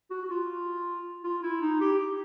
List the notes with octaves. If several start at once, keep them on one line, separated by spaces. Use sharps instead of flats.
F#4
F#4
F4
F4
E4
D#4
G4
G4